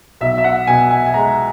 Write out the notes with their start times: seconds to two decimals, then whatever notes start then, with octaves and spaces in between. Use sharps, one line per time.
0.21 B1 E5
0.38 E5
0.44 F#5
0.67 B2 G#5
0.91 G#5
1.06 G#5
1.14 G#3 A#5